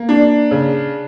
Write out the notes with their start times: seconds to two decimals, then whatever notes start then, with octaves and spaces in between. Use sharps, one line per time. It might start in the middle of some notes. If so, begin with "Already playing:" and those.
Already playing: A#3
0.09 D4
0.51 C#3